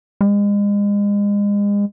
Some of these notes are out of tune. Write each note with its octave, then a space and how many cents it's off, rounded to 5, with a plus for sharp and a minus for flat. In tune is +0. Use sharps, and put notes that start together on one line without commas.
G#3 -35